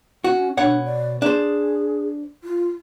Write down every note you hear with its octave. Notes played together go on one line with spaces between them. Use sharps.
C#4 F#4
B2 D4 C#5 F#5
D5
D4 G#4 C5
F4